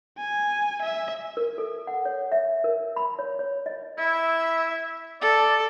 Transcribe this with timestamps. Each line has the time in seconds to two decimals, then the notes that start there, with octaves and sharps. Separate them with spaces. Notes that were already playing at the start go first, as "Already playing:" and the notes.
0.18 G#5
0.82 E5
1.37 A#4
1.58 A4
1.87 F#5
2.05 C#5
2.32 E5
2.64 A#4
2.96 B5
3.19 C#5
3.39 C#5
3.66 D#5
3.98 E4 E5
5.21 A4 D5